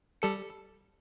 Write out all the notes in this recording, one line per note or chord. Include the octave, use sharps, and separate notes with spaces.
G3 A4 C#7